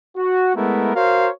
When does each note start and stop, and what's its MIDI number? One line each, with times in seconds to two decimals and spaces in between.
0.17 0.53 66
0.56 0.93 56
0.56 0.93 57
0.56 0.93 59
0.56 0.93 64
0.56 0.93 70
0.96 1.30 66
0.96 1.30 70
0.96 1.30 72
0.96 1.30 73
0.96 1.30 77